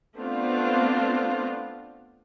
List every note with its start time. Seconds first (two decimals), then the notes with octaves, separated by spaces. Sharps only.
0.16 A3 B3 C4 D4 F4